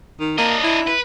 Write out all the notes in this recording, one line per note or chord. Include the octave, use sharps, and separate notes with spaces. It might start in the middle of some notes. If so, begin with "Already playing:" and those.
D#3
A#3 D4 D#5
E4
B4